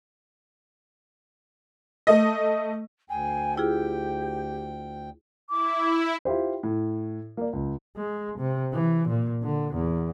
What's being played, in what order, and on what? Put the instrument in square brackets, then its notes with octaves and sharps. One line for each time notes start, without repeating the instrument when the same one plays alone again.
[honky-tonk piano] A3 D#5
[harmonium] D2 G5 [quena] G#5
[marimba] E4 F4 G#4 [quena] G4
[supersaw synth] E4 [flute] D6
[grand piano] E4 F4 G4 C5
A2
A#3 D5
C#2
[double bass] G#3
C3
E3
A#2
D3
E2